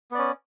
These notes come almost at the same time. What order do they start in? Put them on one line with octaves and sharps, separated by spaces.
B3 D5 C#4